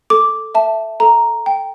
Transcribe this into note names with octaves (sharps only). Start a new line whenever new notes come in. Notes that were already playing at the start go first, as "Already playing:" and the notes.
A4 D6
E5 A5
A4 A#5
G5